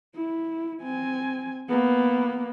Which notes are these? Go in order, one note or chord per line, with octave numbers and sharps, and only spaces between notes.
E4
C4 G#5
A#3 B3